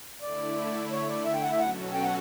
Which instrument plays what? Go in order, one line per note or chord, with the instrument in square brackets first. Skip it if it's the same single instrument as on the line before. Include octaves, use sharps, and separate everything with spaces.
[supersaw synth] D3 A3 E4 [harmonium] D5
[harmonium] C#5
D5
E5
G5
F#5
E5
[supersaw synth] B2 F#3 C#4 F#4 A4 [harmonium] F#5
[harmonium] G5
F#5